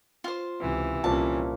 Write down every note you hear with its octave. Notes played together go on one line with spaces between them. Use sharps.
F4 C5
C#2 C3 E3
C2 A#2 F3 C#4 A5